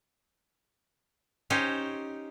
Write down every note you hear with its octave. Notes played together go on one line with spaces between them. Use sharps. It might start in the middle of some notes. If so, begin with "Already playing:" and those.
C#4 D#4 G4 C5